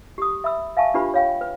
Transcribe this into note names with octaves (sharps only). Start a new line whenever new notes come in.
G4 D#6
E5 B5 E6
E5 F5 G#5 A5 C#6
D4 F4 G4 B4 B5
C#5 F5 G5
B4